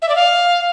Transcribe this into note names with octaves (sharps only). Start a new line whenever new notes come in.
E5
D5
F5